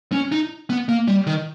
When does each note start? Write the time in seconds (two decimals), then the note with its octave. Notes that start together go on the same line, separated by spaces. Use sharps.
0.12 C#4
0.32 D#4
0.70 B3
0.89 A#3
1.08 G3
1.27 D#3